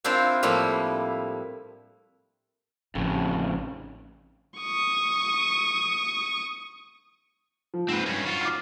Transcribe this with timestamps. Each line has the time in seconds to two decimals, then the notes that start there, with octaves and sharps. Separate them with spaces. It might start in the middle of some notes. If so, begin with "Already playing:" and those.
0.04 C4 D4 E4 F4 A#4 C5
0.43 A2 F3 G3 A#3 E4
2.95 A1 F2 C#3
4.58 C#6 D#6
7.74 F3
7.88 G#2 C4 B4
8.06 G2 C#4
8.25 F4 F#4
8.41 D6 F6